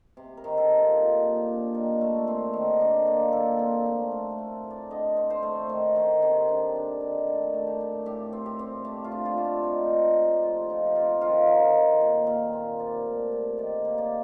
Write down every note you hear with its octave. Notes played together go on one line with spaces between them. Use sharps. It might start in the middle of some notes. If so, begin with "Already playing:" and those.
C3
A#4
D#3
A4
C3
F4
A#2 D#4
A#2
G4
D4
D#3 A#4
A3
C4
D#3
D4
A#3
A#2 A4
C4
A3
A3 A#4
A#4
A3
A2
D5
D3 D#5
C4
C5
A3
D#3
D#3
C3
D4
D4
D#3
G4
A3 A4
A3
G4
A3
A2 G4
C4
G4
C4
A3
F4
D4
F4
A3
G4
C4 D#4
D#4
C4
A3
G4
F3 F4
F3 D#4
G4
C4 F4
D#3 F4
D#3
D#3
A#2
A#2
C4
C3 D5
A3
C3
D#3 D5
A#3
D5